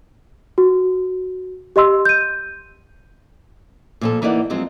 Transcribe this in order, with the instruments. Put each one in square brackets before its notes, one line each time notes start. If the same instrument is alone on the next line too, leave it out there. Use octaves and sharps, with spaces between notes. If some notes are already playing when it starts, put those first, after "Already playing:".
[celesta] F#4
G4 D#5 C6 E6
G6 D#7
[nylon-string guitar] A#2 F3 A4
E3 A#3 D#4 D5 F#5
F3 F#3 G#3 C4